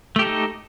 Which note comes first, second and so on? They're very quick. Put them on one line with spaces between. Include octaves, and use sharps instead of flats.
A3 G4 A4 D#4